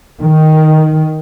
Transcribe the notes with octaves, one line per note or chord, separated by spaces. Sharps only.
D#3